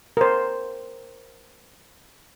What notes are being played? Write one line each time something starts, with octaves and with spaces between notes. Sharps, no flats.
A#4 C5